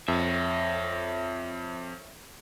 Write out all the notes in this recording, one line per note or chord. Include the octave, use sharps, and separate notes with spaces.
F2 C#5 E5